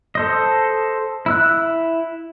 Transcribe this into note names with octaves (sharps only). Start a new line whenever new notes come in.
A4 C5 D#5
E4 E6 F#6